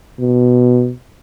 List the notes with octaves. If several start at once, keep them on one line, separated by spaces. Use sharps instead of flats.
B2